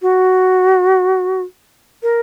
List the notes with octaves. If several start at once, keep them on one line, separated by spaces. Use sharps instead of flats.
F#4
A#4